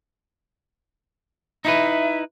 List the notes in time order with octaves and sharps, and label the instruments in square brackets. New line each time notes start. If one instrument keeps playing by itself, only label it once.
[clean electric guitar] D#4 E4 B4 [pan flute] E5